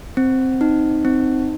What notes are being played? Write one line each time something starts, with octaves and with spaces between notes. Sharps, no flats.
C4
D#4
C4